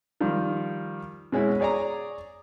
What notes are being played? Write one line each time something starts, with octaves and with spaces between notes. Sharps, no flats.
D#3 F3 G3
B2 G#3 C#4 E4
G#4 C#5 D5 G#5 A#5